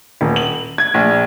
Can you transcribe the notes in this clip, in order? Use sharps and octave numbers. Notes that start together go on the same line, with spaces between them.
D#1
F#7
G#6
A#1